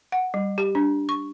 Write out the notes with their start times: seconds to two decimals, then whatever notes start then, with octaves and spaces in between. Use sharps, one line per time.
0.12 F#5
0.34 G3
0.58 G4
0.75 D4
1.09 C#6